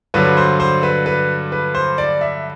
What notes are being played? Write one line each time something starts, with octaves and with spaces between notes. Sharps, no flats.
G2 D3 F#3 B4
C5
C5
B4
B4
B4
C5
D5
E5